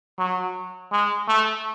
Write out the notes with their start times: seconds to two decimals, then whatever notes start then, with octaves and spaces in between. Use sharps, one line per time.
0.19 F#3
0.92 G#3
1.28 A3